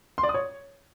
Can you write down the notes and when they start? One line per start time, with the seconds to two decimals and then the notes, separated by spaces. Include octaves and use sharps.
0.18 C6
0.23 D5
0.29 D#6
0.34 C#5